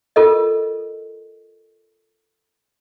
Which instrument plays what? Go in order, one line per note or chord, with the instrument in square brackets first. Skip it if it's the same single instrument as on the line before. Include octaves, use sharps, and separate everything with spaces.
[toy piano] F4 A4 A#4 D#5